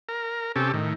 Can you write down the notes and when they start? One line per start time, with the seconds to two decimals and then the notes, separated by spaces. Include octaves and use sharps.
0.09 A#4
0.56 C3 C#4 G4 A4
0.74 A2 D#3